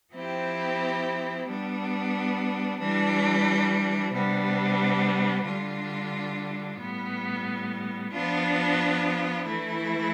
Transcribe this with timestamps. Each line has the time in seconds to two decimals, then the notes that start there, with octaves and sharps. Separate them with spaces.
0.14 F3 C4 E4 G4
1.47 G3 B3 D4
2.80 E3 G3 D4
4.13 C3 G3 B3 D4
5.45 D3 G3 D4 F4
6.79 A2 G3 B3
8.12 F3 B3 D4 F4
9.45 E3 A3 E4